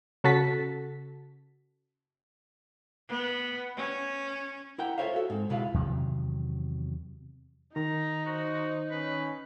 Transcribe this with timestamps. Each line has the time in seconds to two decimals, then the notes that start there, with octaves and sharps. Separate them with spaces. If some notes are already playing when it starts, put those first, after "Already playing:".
0.24 C#3 F#4 A4 A5 B6
3.09 B3
3.77 C#4
4.78 E4 A#4 F#5 G5
4.98 F4 A4 C5 C#5 E5 F5
5.13 F#4 A4
5.30 G#2 C4
5.49 C#2 B2 G#3 E4 F4 F5
5.74 E2 C3 D#3 F#3
7.76 D#3 D#4 A#5
8.26 F#4 C5
8.91 C#4 B4